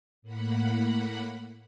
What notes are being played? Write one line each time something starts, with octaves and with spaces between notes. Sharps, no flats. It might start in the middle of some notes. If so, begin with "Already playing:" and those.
A2 A#3 F#5 B5